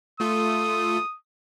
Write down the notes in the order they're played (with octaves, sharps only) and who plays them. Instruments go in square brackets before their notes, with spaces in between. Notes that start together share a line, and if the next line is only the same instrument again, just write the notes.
[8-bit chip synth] A3 F4 A4 [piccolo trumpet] D#6